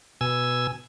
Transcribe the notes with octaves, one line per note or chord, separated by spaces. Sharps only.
B2 G#5 E6